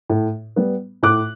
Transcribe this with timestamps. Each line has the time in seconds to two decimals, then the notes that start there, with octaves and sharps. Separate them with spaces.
0.10 A2
0.56 G3 B3
1.03 A2 D6 F#6